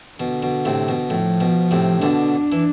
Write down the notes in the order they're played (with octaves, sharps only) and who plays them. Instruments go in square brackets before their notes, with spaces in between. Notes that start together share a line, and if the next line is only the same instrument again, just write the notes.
[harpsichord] B2 [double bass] D3
[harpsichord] B2
A2 C3
B2
[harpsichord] A2 [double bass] F3
[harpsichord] B2
A2 C3
[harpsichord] B2 D3 [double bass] D4
[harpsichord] E3